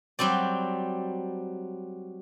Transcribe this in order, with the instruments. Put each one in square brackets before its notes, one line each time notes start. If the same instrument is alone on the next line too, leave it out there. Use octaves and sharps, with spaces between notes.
[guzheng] F#3 G3 C4 D5